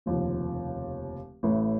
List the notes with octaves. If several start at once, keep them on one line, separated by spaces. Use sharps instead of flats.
F1 D#2 C#3 F3
A1 A2 A3